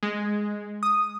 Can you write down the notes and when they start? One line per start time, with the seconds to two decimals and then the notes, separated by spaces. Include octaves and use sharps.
0.03 G#3
0.83 D#6